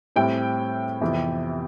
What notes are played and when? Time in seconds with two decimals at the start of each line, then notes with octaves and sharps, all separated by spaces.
0.16 A2 G3 C4 E4 G5
1.01 F2 C3 E3 B3 E4